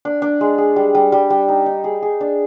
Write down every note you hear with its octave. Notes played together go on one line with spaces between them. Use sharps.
D4
D4
G#3
G#4
G3
G3
G3
G3
D#4
D#4
G#4
G#4
D4